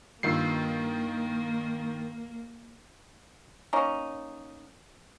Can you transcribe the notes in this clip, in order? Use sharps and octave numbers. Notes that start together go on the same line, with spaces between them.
G2 D#3 A#3 F4 E6 C7
A#3 C#4 D#4